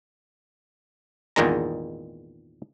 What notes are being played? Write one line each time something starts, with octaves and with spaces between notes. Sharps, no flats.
G#1 E2 A#2 D#3 G#3 A#5